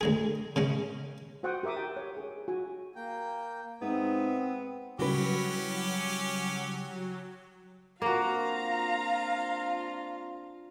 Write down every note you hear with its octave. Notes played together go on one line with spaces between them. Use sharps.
D2 G#3 G#4
C#3 G#3 C#4
F#4 C5 F#5 G5 C#6 D#6
G4 A#4 E5 D6 D#6
G5
C#5
G#4
F#4 G#5
A#3 G5
G#2 B3 C4 E5 D#6
C#3 F#3 G3 C#4 E4 F#4 G4 B4
A#3 C4 D4 F4 F#4 F5 A#5